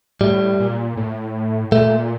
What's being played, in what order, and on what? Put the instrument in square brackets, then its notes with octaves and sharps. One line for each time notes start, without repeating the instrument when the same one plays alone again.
[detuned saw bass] A2 [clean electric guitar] G3
[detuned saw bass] A#2
A2
[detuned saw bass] A#2 [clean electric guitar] A3